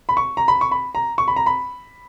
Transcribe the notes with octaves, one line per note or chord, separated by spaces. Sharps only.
B5
C#6
A#5
B5
C#6
B5
A#5
C#6
B5
A#5
B5